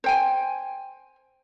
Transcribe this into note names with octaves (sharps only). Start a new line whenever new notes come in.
C5 G5 G#5